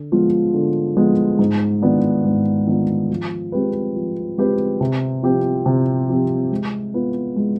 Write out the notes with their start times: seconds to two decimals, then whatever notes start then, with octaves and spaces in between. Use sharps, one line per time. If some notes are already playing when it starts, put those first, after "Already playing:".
Already playing: D3
0.12 F3 G#3 B3 F4
0.54 D3
0.97 F3 G#3 B3 F4
1.39 G#2
1.82 D#3 B3 D4 F4
2.24 G#2
2.67 D#3 B3 D4 F4
3.10 F3
3.52 G#3 C4 G4 B4
3.96 F3
4.38 G#3 C4 G4 B4
4.81 C3
5.23 F3 C4 G4
5.66 C3
6.09 F3 C4 G4
6.52 G#3
6.94 B3 F4 B4
7.36 G#3